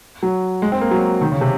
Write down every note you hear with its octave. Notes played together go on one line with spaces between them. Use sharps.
F#3
G#3
C4
A#3
F#3
D#3
C#3
C3